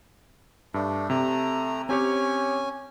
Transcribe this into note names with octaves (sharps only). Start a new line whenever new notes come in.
G2 A3 D4
C3 A3 A#5
C4 C#4 G4 C#5 G#5